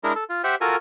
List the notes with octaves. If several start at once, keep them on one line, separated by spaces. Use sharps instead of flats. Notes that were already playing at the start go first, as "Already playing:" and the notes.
G#3 D4 E4 A#4
A4
F4
G4 C5 E5 F#5
F4 F#4 A4 A#4 G#5